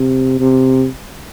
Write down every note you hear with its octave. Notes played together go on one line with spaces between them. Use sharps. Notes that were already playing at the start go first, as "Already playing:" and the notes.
Already playing: C3
C3